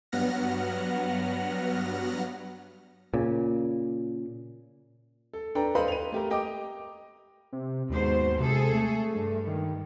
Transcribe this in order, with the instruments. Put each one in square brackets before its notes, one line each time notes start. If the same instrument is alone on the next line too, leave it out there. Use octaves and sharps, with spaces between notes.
[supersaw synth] G2 F#3 B3 F#5 F6 A#6
[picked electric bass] A#2 C#3
[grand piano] A4
D4 A4 B4 G5 A#5
A4 B4 C5 D#5 F5 B5
D#7 F7
A3 G4 A#4
G4 D#5 G5 D6
[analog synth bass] C3
[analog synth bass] D#2 [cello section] G#2 B2 C5
[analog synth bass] C3 [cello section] G#4 A4
[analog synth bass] A3
[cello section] G2
[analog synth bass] D#3